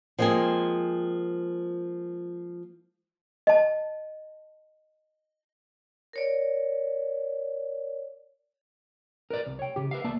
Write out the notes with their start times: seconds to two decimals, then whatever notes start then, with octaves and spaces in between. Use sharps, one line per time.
0.19 F3 G#3 A#3 C4 G#4
3.47 D#5 A5
6.13 A#4 C#5 D5
9.30 A#4 B4 D5
9.46 C2
9.59 C#5 G5
9.76 C#3 G4
9.91 B4 E5 F5
10.04 C2 A#3 D5 E5 A5